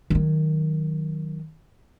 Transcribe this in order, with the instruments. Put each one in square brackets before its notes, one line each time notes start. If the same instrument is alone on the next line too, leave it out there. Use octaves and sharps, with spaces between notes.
[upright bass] D#3 F#3